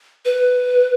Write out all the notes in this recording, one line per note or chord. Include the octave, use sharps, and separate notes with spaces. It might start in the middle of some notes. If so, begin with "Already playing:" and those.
B4